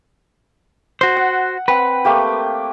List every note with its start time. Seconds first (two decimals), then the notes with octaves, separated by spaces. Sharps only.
1.01 F#4 C5
1.17 F#5
1.68 C4 B4 F#5
2.05 A3 A#3 G4